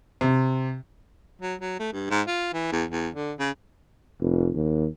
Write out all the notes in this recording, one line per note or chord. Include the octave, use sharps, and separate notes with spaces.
C3
F#3
F#3
A3
G2
G#2
F4
E3
E2
E2
D3
C#3
F1
D#2